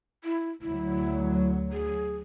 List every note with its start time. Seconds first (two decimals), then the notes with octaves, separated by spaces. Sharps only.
0.24 E4
0.62 D2 F#3 E4
1.73 G#4